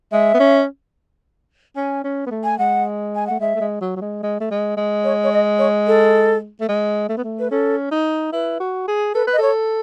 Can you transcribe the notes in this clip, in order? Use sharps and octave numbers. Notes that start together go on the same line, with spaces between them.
G#3 E5
B3
C#4
C#4 G#5
C#4
B3
A3
G#5
G#3 F#5
G#5
A3 F#5
G#3 E5
A3
G#3
F#3
F#3
G#3
G#3
A3
G#3
G#3
C#5
C#5
D#5
C#5
A4
A3
G#3
A3
B3
A3
B4
C#4 A4
D#4
E4 B4
F#4
G#4
A4 B4
B4
D#5
A4 C#5